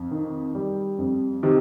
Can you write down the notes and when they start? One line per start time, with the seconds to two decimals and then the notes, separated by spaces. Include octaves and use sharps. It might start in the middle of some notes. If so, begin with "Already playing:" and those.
Already playing: F2
0.11 D#3
0.55 G3
0.98 F2
1.43 C3 D#3